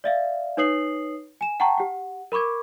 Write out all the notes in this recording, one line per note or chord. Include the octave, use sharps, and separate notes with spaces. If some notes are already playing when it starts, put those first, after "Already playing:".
D5 E5 F5
D#4 B4 C#5 D#6 C7 F#7
G#5 E7
F#5 G5 A5 A#5 C#6
G4 F#5
A#4 B5 C#6 D6 G#6